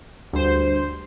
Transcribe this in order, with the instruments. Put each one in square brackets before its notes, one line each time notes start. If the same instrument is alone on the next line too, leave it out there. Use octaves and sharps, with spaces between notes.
[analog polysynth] D2 C5 [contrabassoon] G2